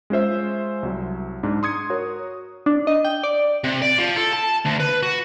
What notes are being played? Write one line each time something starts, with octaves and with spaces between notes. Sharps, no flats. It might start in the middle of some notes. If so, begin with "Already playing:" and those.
G#3 C#4 F4 C5 E5
C2 F#3
G#2 D4
C6 D#6 G#6 C#7
F#4 A#4 C#5
D4
D#5
G5
D5
C3
D5
F3
A4
A5
D2
B4
F#4